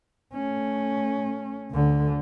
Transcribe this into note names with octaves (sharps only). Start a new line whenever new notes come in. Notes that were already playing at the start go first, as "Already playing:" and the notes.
A3 C#4
D2 D3